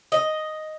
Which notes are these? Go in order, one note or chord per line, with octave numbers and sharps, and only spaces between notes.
D#5